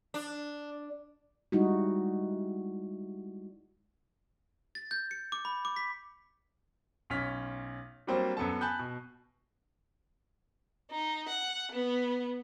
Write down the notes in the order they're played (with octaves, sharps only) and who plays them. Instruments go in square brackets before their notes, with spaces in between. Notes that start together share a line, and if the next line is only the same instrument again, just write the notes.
[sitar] D4
[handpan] G3 G#3 D#4 E4 F#4
[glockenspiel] A6
G6
C#7
D6
B5
D6
B6
[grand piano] B1 C#4 F6 B6
F#3 G3 A#3 C4 D4 C5
F#2 B3 A4 A5
G#5 A5 B5 F#6 G6
B2
[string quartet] D#4
F#5
B3